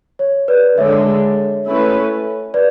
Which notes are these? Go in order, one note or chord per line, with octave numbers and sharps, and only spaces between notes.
C#5
B4 D5
D3 G#3 D4 A4 C#5 E5
A3 C#4 E4 B4
B4 D5